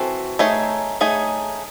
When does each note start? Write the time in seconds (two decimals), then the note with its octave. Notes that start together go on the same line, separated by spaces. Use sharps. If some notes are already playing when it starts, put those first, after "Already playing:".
Already playing: E3 C4 F#4 A4
0.39 A3 D#4 G#4 C#5
1.01 A3 D#4 G#4 C#5